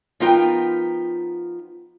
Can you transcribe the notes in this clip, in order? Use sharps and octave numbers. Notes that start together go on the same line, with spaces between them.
F3 B3 D#4 F4 A#4 G5